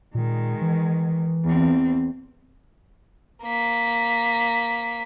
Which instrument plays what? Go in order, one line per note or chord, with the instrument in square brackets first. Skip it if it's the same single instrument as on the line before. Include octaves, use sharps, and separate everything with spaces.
[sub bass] A#2 [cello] D#3 G#3
[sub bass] E3
[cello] E2 C4
[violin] A#3 B6